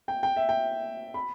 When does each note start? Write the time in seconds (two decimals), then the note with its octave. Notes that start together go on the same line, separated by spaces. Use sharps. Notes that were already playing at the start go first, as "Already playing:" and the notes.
0.08 G5
0.23 G5
0.36 E5
0.49 G5
1.14 B5